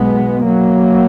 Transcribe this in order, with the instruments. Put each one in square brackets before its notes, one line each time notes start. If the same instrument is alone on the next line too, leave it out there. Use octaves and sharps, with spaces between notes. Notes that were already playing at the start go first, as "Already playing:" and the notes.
Already playing: [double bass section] B1 B2 G#3 B3
F#3 A#3